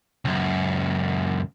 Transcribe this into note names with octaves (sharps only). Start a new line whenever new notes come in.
C#2 F#2